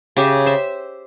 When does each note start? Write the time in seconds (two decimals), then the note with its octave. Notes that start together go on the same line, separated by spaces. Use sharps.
0.17 C#3 G4 E5
0.46 C5 E5